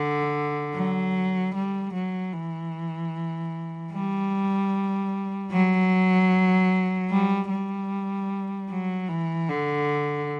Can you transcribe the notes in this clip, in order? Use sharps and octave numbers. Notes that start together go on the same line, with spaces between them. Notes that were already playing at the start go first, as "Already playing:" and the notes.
Already playing: D3
F#3
G3
F#3
E3
G3
F#3
G3
G3
F#3
E3
D3